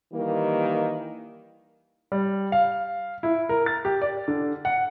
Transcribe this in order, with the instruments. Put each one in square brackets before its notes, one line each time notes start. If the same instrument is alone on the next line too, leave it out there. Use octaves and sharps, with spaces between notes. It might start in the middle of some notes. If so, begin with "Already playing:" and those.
[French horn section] D#3 E3 G3 A#3
[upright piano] G3
F5
E4
A#4
A6
G4
D5
D3
F#5